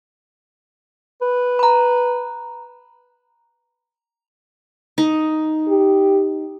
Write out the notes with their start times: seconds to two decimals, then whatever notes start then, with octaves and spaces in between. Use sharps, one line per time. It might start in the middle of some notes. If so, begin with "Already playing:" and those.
1.21 B4
1.59 A#5 B5
4.98 D#4
5.68 G4